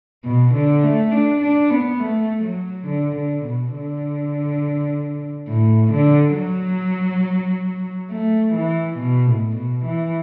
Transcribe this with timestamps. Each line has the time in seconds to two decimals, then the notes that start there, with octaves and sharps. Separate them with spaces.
0.24 B2
0.54 D3
0.83 A3
1.12 D4
1.41 D4
1.70 B3
2.00 A3
2.44 F#3
2.87 D3
3.16 D3
3.45 B2
3.74 D3
5.49 A2
5.92 D3
6.36 F#3
8.11 A3
8.54 E3
8.98 B2
9.27 A2
9.56 B2
9.85 E3